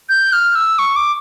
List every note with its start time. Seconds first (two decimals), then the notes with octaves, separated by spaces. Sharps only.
0.09 G6
0.33 F6
0.55 E6
0.79 C#6
0.96 D6